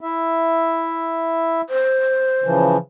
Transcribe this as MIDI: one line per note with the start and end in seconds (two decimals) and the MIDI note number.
0.01 1.61 64
0.01 1.61 76
1.70 2.66 72
2.44 2.77 49
2.44 2.77 52
2.44 2.77 53